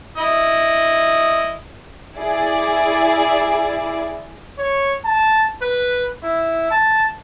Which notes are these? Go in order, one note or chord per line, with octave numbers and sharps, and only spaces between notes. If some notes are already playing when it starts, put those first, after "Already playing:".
E4 D#5
E4 G#4 D5
C#5
A5
B4
E4
A5